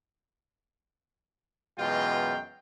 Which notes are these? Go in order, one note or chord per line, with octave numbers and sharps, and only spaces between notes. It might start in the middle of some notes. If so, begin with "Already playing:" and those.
F#2 B2 E3 G#3 F4 G5